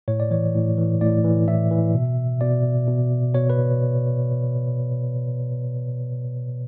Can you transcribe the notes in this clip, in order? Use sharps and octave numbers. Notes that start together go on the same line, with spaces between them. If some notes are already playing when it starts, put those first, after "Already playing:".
A2 C#5
D5
E3 C#5
A2
E3
A2 D5
E3
A2 E5
E3
B2
B2 D5
B2
B2 C#5
B4